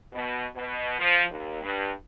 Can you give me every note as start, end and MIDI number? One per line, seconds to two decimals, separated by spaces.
0.13 0.45 47
0.55 0.95 47
0.99 1.22 53
1.30 1.59 39
1.62 1.90 43